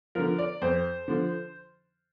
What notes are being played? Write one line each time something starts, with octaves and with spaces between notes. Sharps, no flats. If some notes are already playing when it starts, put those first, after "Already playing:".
D3 F3 A#4
D5
F2 C5
D3 F3